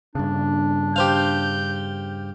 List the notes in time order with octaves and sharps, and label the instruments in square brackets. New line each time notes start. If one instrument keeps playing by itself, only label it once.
[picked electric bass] G2 C#3 [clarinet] D4
[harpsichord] G4 C5 F5 [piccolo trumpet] G6